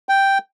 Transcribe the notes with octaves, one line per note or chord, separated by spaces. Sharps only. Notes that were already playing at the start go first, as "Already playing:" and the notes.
G5